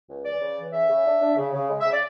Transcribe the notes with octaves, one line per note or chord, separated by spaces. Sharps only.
C#2
E3 D5
C#3
E3
C#3 E5
C#3
D4
D4
C#3
C#3
G#3
E5
C#3
D5